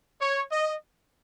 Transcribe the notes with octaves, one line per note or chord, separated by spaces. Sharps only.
C#5
D#5